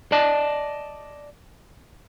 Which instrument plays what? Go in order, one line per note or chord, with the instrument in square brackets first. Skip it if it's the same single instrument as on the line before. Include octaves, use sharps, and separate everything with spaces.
[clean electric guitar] D5 D#5 A5